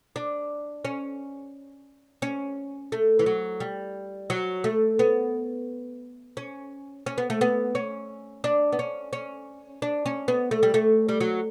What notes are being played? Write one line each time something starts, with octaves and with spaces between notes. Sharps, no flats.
D4
C#4
C#4
A3
E3
F#3
G3
F#3
A3
B3
C#4
C#4
B3
A3
B3
C#4
D4
B3
C#4
C#4
D4
C#4
B3
A3
G3
A3
G3
F#3